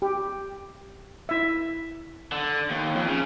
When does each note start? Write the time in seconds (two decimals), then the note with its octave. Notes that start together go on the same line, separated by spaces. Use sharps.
0.02 G4
1.29 E4 E5
2.32 D3
2.70 D#2
2.95 F2
3.08 C#3